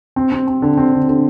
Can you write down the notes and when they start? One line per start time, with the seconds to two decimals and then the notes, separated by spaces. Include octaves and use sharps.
0.16 C4
0.32 C4
0.47 C4
0.62 D3
0.77 C4
0.93 D3
1.08 D3